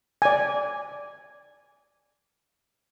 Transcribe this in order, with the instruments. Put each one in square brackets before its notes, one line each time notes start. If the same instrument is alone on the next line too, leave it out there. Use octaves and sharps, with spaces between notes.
[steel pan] D5 G#5